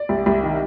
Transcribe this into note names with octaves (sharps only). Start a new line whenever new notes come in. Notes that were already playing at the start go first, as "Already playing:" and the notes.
Already playing: D5
C2
C2
D#3